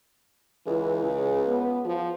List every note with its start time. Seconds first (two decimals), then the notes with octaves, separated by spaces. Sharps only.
0.67 C#2 E3
1.03 C#3
1.47 B3
1.85 F3